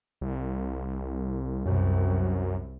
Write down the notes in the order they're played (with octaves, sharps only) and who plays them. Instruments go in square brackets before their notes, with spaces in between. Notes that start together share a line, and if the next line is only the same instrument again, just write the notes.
[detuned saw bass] C2
[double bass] C2 [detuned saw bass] F#2